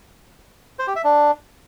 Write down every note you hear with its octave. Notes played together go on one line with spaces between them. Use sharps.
C5
G4
E5
D4